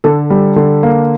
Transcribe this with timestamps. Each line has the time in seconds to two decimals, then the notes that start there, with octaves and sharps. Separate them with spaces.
0.04 D3 A4
0.30 G3
0.56 D3
0.83 A#3